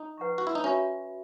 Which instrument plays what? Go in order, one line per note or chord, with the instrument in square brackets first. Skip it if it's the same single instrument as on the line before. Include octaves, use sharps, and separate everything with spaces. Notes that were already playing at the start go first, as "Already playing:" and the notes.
Already playing: [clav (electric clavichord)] D#4
[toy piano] B4 F#5 A#5 C#6
[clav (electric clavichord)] F#4
E4
D#4
[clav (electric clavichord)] C#4 [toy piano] F#4 C#5 E5 B5